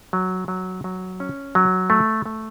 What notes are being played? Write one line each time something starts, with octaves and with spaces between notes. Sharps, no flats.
F#3
F#3
F#3
C#4
F#3
A3
A3